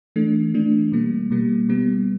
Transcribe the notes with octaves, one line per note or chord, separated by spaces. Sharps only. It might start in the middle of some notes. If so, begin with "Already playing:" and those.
E3 A3 D4
E3 A3 D4
B2 G3 A#3
B2 G3 A#3
B2 G3 B3